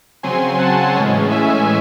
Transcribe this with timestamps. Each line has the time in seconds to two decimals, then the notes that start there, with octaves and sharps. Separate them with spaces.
0.23 C#3 F#3 C4 G#5 C6
0.59 F#5 A5
0.95 A2 E3 G#3 C#4
1.30 E5 G#5